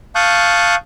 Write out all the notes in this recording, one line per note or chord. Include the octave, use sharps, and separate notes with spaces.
F5 A5 C#6 D#6 F#6 G6